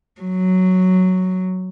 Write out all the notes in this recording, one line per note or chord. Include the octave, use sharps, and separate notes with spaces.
F#3